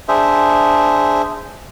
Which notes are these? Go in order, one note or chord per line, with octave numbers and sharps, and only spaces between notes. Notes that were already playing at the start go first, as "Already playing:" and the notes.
D4 G#4 C5 E5